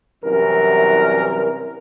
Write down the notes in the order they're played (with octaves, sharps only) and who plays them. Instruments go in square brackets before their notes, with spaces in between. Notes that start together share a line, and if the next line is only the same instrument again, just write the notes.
[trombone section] C2 F#2 E3 A#4